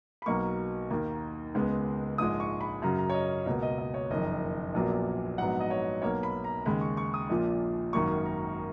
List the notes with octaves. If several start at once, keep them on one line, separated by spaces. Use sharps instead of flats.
B5
B1 B2 F#3 A#3 C#6
D#2 D#3 A#3
C#2 C#3 G#3 B3
A#1 G#2 F3 G#3 D#6
C#6
B5
F#2 C#3 F#3 A#5
A#5
C#5
D#5
C#2 B2 A#3
D#5
D#5
C#5
F#1 F2 D#3 D#5
A#1 A#2 F#3 B3
A#1 G#2 F#3 B3 F#5
D#5
C#5
B1 B2 A#3 C#5
B5
A#5
D#2 C#3 G#3 B5
C#6
C#6
D#6
A#1 A#2 F3
G#1 F#2 D#3 A#3 C#6
A#5